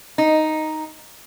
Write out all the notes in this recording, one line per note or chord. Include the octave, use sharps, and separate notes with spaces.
D#4